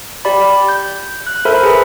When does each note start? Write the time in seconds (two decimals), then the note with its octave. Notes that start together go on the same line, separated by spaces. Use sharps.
0.25 G4 D5 B5
0.69 G6
1.27 F#6
1.45 A4 A#4 C5 E5 B5 F6
1.63 G#4 B4 E5